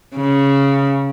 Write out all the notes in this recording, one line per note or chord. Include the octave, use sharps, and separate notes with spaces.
C#3